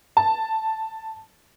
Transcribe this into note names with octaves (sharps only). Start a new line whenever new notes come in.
A5